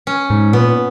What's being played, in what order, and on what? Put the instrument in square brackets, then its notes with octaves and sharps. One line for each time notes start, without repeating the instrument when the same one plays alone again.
[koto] C#4
[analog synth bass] G#2
[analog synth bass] A#2 [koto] B3